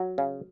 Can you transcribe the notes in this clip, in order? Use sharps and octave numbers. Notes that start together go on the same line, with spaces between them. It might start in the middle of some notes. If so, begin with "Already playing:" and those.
Already playing: F#3
C#3